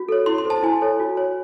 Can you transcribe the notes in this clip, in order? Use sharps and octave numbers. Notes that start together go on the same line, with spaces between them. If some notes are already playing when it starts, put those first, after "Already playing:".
Already playing: F#4
A4 C#5
E4 C6
C6
A4 C5 A5
E4 G#5
A4 C#5
F#4
C#5